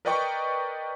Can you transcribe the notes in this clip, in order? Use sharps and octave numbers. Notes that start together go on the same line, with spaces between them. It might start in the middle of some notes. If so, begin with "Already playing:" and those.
A#4 B4 D5 D#5 G5 C#6